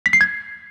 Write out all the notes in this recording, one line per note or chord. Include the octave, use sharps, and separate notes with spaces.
B6
C7
G#6